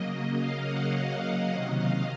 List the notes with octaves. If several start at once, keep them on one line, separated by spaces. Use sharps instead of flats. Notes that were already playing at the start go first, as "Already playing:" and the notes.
Already playing: C#3 F#3 A#3 D#5
F5
F#5
F#5
F#5
C3 D#3 F#3 D#5
F5